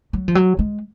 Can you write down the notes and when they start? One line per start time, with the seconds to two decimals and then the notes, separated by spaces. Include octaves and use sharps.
0.13 F#3
0.28 F3
0.35 F#3
0.59 G#3